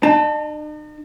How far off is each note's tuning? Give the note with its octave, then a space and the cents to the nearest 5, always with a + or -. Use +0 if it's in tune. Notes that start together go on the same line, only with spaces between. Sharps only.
D#4 -45 A5 +0